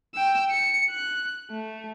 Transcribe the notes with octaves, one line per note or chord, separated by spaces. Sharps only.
G5 E6
C#7
F#6
A3